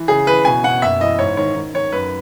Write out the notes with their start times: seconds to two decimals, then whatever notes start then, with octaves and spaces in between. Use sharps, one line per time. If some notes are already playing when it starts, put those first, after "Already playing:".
Already playing: E3
0.08 C#3 G#4
0.27 E3 B4
0.45 B2 G#5
0.64 B2 F#5
0.82 F#1 E5
1.01 E3 D#5
1.19 G#2 C#5
1.37 D#3 C#5
1.56 D#3
1.74 D#3 C#5
1.92 F#2 B4